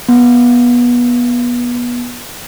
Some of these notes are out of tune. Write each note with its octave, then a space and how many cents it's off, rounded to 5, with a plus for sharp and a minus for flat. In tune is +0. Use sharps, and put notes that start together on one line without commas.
B3 -25